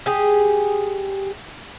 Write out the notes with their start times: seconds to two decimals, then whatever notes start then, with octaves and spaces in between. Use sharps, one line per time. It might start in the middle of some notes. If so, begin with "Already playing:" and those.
0.06 G4 G#4